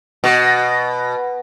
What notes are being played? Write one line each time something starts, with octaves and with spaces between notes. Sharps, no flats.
B2